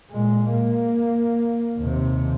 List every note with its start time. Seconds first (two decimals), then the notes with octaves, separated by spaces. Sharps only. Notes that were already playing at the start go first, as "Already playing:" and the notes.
0.10 A#2 G#3
0.52 A#3
1.79 D#2 C3